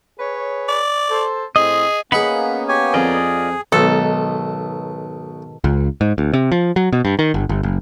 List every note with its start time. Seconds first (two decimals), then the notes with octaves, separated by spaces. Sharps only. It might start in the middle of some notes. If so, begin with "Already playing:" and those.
0.20 G#4 B4 C#5
0.68 D5
1.10 A4 C5
1.56 A2 C4 G#4 D#5
2.12 A#3 B3 C#4 D#4 G#4 B4 F#5 B5
2.68 G4 C#5 G#5
2.94 F2 F4 G#4 D5 D#5
3.72 B1 G#2 B2 D#3 A4
5.64 C#2
6.01 G#2
6.18 D2
6.33 C3
6.52 F3
6.76 F#3
6.93 B2
7.05 G2
7.19 D#3
7.34 G1
7.49 G1
7.63 F#1